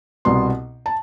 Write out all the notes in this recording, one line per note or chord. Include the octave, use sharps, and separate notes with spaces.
C2 B2 B3 C6
A5